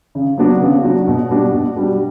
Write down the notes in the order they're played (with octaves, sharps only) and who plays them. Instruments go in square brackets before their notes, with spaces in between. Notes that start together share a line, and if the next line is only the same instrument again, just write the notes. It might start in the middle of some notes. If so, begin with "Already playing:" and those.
[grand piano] C#3
F#3 B3 D4 F#4
C#3
F#3 B3 D4 F#4
B2
G3 D4 F#4
B2
G3 D4 F#4